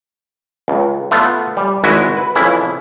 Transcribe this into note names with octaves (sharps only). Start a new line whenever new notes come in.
C#2
A3 B3 F4
G3
G#1 G#3 E4 F#4 D#5
B4
F2 C#3 E3 E4